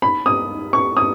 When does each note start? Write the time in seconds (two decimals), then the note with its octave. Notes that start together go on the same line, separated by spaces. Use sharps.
0.02 B5
0.26 D#6
0.73 C#6
0.97 D#6